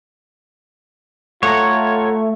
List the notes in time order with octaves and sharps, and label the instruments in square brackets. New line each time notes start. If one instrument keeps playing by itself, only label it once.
[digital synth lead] A3 [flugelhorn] F4 [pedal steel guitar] C#5 [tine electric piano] F#5 A#5